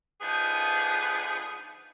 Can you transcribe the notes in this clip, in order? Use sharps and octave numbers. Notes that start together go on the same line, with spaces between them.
D3 F3 B3 D#4 G#4 B4